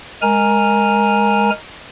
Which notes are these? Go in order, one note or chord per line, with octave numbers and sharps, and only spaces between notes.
G#3 A#4 G#5 A#5